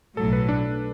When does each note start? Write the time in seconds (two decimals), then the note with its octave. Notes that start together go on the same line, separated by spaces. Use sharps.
0.16 B1 A2 F#3 A4
0.33 B4
0.48 D4